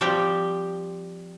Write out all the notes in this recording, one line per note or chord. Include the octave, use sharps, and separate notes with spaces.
F3 G3 C4 G4 G5